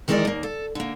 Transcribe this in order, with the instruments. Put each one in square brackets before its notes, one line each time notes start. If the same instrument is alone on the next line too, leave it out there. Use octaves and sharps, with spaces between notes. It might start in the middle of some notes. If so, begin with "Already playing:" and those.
[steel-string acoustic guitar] D#3 E3 G#3 D#4 A#4 D5
D#2 A#3
A4
D3 A#3